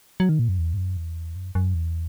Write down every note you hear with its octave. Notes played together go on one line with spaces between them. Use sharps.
F#3
D#3
A#2
F#2
E2
G#2
F#2
E2
F#2
F#2
E2